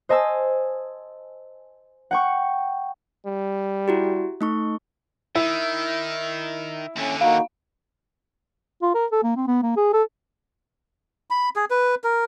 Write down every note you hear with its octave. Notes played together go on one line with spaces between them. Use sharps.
C5 D#5 G#5 A5 E6
F#5 G5 C#6
G3
E4 F#4 G4
A3 D#4 C#6
D#3 E4
D#2 D3 C#4
A#3 D#4 F#4 F5
F4
A#4
A4
A#3
C4
B3
A#3
G#4
A4
B5
G#4
B4
A#4